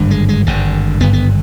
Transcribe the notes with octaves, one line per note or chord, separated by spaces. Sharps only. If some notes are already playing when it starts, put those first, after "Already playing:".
Already playing: G#1 G2 D3
G#3
G#3
G#1 G2 D3
G#1 G2 D3 B3
B3